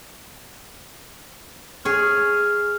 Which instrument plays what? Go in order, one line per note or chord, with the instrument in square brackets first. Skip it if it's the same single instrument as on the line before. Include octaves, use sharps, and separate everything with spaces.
[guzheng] G#4 C#5 [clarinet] F6